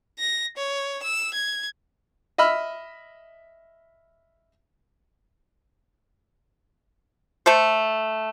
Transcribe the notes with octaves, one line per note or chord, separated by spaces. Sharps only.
A#6
C#5
E6
G#6
D#5 E5 B5 E6 F6
A3 A4 C5